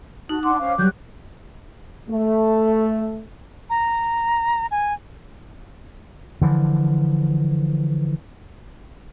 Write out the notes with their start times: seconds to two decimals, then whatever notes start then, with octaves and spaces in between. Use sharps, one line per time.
0.29 D#4 F#4 A5 F#6
0.43 D4 F#5 C6 D6
0.59 C#4 C5 F5
0.78 F#3 G3 G4 F#6 G6
2.10 A3
3.70 A#5
4.71 G#5
6.42 D3 E3 F3